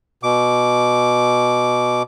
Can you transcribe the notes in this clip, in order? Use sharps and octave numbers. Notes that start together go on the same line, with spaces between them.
B2 D6